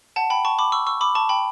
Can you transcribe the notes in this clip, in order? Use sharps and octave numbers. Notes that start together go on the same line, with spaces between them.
F#5 A5
G5 B5
A5 C#6
B5 D6
C#6 E6
C#6 E6
B5 D6
A5 C#6
G5 B5